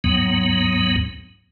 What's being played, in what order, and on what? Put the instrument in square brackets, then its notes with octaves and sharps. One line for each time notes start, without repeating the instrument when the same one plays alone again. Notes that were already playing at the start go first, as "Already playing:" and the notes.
[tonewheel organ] D#2 G#2 F#3 B3